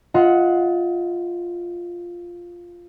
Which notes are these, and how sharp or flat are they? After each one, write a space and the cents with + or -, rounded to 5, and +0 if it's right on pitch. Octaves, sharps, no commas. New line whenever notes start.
F4 +0 D#5 +30 F#5 +0